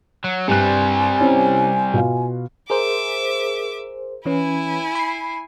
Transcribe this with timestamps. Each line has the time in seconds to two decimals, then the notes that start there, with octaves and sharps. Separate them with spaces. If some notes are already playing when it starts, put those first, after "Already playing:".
0.24 F#3
0.48 G2 C3 G3 G#5 F#6
1.21 C4 C#4 E4
1.94 B2 F4 F5
2.70 G#4 A#4 C5 E5 D6
4.26 E3 C#4 E4 B4 G#5
4.95 B5 C7